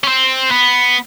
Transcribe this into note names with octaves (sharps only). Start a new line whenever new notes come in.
C#4
C4
B3